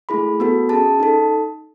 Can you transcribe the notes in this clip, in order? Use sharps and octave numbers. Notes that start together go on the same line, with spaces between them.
A3 E4 G#4 B5
B3 F#4 A4
C#4 G#4 A5
D#4 A4